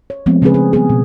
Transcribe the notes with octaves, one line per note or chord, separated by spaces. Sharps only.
C#5
F3 G#3 A3 B3 C4
C#3 G#3 C4 C#4 G#4 B4
G#4
G3 G#3 B3 G#4
B2